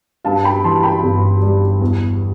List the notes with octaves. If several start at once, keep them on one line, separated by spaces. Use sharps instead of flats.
G2 F5 A5
G5 B5
E3 A5 C6
G5 B5
G1
G3
E2